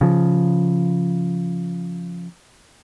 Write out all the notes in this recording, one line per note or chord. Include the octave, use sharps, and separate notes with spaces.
C#3 F3